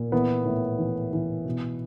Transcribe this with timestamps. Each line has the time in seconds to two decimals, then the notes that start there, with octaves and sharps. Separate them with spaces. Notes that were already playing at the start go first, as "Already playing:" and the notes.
Already playing: A#2
0.12 E3 B3
0.45 A2
0.78 E3
1.13 E3
1.45 B2